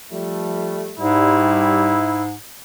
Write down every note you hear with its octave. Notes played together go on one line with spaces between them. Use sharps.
F3 G3 A3
G#2 G3 E4